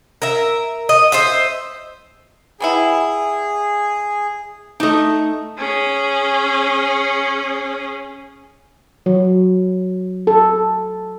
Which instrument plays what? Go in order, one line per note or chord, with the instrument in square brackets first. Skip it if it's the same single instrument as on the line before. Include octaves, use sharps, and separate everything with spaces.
[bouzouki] A#4 E5
D#5
C5 D#5 E5
[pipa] G3 B3 E4 [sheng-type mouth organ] G#4
[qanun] A3 D#4 [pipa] D4 D#5
[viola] C#4 G#4
[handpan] F#3
A4